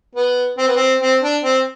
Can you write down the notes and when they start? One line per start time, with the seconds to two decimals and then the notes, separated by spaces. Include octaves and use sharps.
0.15 B3
0.58 C4
0.67 B3
0.76 C4
1.00 C4
1.22 D4
1.43 C4